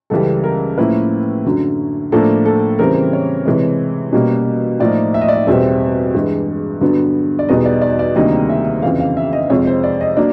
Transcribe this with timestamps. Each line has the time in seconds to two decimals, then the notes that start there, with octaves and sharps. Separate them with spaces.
0.10 C#2 C#3 E3 G3 A4
0.44 A#4
0.78 A2 F3 A#3 C#4 E4 B4
1.45 F#2 D3 F#3
2.12 A2 F3 A#3 D4 A4
2.46 A4
2.79 C#3 E3 G3 C4 A#4
3.13 C#5
3.45 C3 E3 G#3
4.13 B2 G3 A#3 C#4
4.80 A2 F3 A#3 D#4 D5
5.14 E5
5.21 D#5
5.28 D5
5.35 D#5
5.47 E2 B2 G3 C4 E5
6.14 G2 E3 G#3
6.81 G2 D3 F#3 B3
7.39 D5
7.49 E2 B2 G3 B3 D#4 D#5
7.66 D5
7.82 D5
7.99 D5
8.16 D2 C3 D#3 G3 A#3 D#5
8.50 E5
8.82 F2 C#3 E3 F5
9.00 F5
9.17 E5
9.33 D#5
9.50 F2 C3 F3 G#3 C#5
9.67 C5
9.84 D5
10.01 D#5
10.17 F#3 A#3 D4 D5